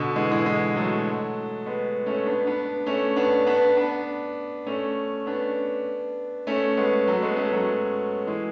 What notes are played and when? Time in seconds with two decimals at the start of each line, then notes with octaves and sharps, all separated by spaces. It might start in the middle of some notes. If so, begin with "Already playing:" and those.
Already playing: B2 D3
0.16 E3 G#3
0.31 E3 G#3
0.46 E3 G#3
0.76 F#3 A3
1.66 G#3 B3
2.06 A3 C#4
2.26 B3 D4
2.47 B3 D4
2.86 A3 C#4
3.16 B3 D4
3.46 B3 D4
3.77 B3 D4
4.66 A3 C#4
5.26 B3 D4
6.47 A3 C#4
6.77 G#3 B3
7.07 F#3 A3
7.22 G#3 B3
7.37 A3 C#4
7.52 F#3 A3
8.27 E3 G#3